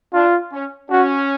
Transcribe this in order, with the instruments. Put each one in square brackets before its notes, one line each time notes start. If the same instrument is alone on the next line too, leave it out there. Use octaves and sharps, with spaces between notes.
[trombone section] D4 [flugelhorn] F4
[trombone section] C#4
[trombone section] C#4 [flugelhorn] F#4